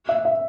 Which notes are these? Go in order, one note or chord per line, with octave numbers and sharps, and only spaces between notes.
E5
E5